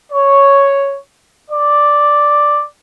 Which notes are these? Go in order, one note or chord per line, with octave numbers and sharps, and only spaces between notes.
C#5
D5